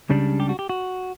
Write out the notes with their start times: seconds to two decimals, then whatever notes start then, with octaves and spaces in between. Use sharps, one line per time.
0.09 C#2 C#3 G3 D4
0.40 G4
0.49 F#4
0.59 G4
0.69 F#4